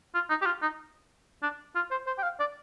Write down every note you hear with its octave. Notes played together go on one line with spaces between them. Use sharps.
F4
D#4
G4
F4
D#4
D4
F4
C5
C5
G5
F5
D5